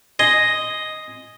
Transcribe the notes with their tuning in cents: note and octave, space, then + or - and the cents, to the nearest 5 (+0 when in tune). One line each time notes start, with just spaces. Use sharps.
D#5 +0 G#5 +0 C6 +0